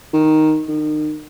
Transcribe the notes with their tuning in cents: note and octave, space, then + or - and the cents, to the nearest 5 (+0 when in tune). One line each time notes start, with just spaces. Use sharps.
D#3 +0
D#3 -35